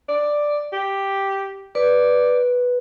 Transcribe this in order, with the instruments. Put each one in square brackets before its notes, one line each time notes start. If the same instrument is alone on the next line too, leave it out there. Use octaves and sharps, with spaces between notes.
[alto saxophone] D5
G4
[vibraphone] B4 [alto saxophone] D5